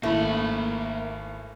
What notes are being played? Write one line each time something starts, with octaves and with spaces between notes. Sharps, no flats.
G#1 A3 A#3 E4 B5